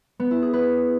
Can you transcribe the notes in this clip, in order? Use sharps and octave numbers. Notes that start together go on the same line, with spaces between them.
B3
E4
G#4
B4